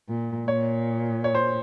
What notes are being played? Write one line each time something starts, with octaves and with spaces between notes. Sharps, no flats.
A#2
A#2 C#5
C#5
C5